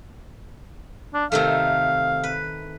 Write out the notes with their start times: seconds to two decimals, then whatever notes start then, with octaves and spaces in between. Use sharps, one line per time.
1.14 D4
1.32 C3 D#3 A3 F5
2.24 B4